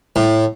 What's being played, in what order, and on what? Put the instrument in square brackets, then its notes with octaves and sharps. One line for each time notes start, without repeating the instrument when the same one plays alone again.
[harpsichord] A2